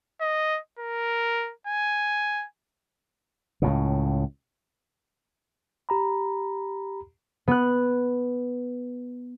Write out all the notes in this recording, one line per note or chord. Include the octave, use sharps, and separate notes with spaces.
D#5
A#4
G#5
C#2 A2 C#3
G4 A#5 B5
B3 F#6